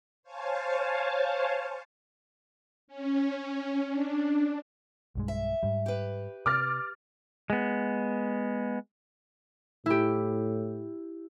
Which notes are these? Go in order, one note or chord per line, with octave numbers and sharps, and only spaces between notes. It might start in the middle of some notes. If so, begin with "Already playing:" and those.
C5 C#5 F5 G#5 A5
C#4
D4
B1 G2 G#3
E5
G#2 G3
G4 B4
C3 D6 F6 A6
G#3 B3
A2 E4 G4